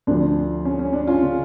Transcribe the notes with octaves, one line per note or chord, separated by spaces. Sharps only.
D2 D3 F3 D4
C#4
C#4
D4
C#4 F4
C#3